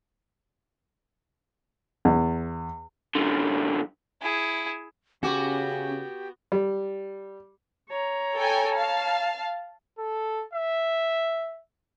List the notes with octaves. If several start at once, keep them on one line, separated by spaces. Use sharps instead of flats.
E2
F#2 D3
E4 G#4
C#3 B3 C#4 F#4 G4 F#5 D6
G3
C#5 A#5
A4 G5 G#5
F5 A5
A4
E5